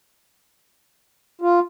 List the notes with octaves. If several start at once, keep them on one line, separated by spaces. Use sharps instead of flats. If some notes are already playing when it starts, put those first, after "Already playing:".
F4